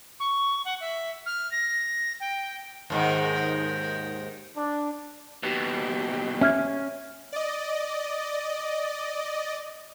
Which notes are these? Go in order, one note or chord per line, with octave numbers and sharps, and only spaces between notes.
C#6
F#5
E5
F6
A#6
G5
D#2 G#2 D#3
D4
D#2 B2 G4
C#4 E5 F6 G#6
D5 D#5